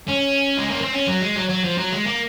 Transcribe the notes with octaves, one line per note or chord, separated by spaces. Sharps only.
C#4
G#3
A#3
C4
C#4
F#3
G#3
F#3
F#3
F3
F#3
G#3
A#3